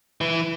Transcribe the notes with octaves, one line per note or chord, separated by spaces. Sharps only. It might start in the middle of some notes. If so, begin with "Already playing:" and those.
E3